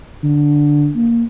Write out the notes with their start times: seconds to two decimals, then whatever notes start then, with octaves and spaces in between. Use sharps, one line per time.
0.24 D3
0.96 A#3